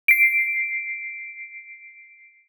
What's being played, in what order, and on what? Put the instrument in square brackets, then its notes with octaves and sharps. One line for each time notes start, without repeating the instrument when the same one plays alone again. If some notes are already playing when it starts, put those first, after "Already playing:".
[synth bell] C7 D7